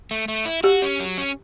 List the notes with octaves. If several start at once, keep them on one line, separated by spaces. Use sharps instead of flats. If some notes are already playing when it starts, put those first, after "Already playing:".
A3
A3
E4
F#4 G4
C#4
F#3
C#4